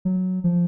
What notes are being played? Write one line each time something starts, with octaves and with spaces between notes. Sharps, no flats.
F#3
F3